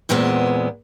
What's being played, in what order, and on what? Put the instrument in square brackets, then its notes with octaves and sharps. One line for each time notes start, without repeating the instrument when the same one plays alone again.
[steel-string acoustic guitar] E2 A#2 G#3 B3 C4